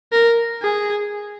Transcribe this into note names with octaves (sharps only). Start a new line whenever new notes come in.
A#4
G#4